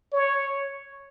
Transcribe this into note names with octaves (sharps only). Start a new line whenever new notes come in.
C#5